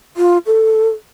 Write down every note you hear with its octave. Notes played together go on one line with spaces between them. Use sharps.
F4
A4